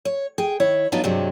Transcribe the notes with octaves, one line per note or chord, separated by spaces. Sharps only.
C#5
G#4 G5
D#3 E4 C#5
F3 F#3 B3 D4 D#4 F4
G2 C3 F#3 G#3